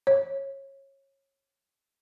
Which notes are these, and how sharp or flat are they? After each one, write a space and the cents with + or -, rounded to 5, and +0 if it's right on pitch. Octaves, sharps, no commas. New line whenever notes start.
C#5 -25